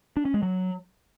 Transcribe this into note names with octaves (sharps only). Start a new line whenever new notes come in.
D4
C#4
G#3
F#3